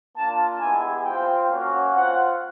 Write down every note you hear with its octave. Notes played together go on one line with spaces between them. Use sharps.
A#3 D4 F4 A5
G#3 B3 E4 G4 G#5
C4 F4 G5
A#3 C#4 F#4
C4 F4 F#5